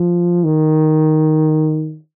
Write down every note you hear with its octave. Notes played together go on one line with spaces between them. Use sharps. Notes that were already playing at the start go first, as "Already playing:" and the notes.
Already playing: F3
D#3